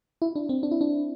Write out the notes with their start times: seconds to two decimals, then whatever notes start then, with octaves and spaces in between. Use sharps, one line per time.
0.22 E4
0.36 D4
0.49 C4
0.63 D4
0.71 E4
0.81 D4